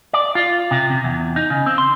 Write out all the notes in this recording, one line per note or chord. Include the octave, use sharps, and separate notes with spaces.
D5
F4
C3
C3
E2
D#4
C#3
C4
C6